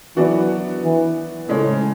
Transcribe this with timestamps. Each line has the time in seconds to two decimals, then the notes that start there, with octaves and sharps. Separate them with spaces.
0.17 E3 F#3 B3 D4 F#4
0.83 E3
1.49 A2 C#3 G#3 C#4